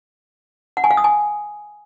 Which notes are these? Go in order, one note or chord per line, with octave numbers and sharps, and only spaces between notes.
F#5
G#5
F5
D#6
G#5